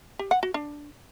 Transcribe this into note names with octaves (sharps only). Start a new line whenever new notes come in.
G4
F#5
F#4
D4